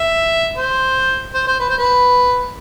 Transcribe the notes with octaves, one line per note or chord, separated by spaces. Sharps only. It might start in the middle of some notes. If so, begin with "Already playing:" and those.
Already playing: E5
C5
C5
C5
B4
C5
B4